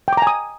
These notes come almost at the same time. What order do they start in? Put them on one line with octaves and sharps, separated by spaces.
G5 D6 A#5 G#5 D#6